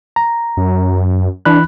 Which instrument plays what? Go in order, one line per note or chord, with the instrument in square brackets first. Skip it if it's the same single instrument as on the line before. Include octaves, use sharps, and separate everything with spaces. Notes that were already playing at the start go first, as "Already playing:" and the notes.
[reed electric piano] A#5
[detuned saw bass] F#2
[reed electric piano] E3 B5 F#6 [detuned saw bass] D4